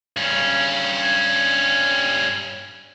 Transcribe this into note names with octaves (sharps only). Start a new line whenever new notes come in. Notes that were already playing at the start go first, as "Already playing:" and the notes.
G2 C#4